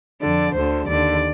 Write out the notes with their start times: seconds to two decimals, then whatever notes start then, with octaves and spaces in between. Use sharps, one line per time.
0.21 F2 D3 D5
0.55 D2 D3 C5
0.88 D#2 D3 D5